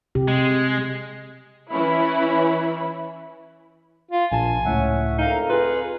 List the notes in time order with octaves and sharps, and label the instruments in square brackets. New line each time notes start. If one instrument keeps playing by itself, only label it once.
[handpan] C3 G4
[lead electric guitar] G#3
[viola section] E3 [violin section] C#4 E4 B5
[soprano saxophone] F4
[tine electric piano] A#1 A5 [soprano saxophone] G#5
[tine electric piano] C#2 A2 [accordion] C#4 E5 F#5
[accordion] F2 A#4 A#5 [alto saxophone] D#4 [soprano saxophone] F5
[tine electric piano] F4 [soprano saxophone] G#4 [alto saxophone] B4